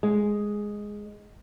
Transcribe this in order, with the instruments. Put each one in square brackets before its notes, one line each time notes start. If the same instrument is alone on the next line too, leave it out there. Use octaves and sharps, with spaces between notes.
[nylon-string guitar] G#3